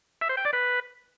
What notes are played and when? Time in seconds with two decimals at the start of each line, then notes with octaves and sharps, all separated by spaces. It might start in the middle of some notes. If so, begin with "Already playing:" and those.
0.21 E5
0.29 C5
0.37 G5
0.45 D5
0.53 B4